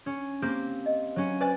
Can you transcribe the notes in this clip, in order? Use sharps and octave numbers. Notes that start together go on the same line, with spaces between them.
C#4
A#3 C4 G4
D#5
F#3 C#4
B4 C5 D5 G#5 F#6 A6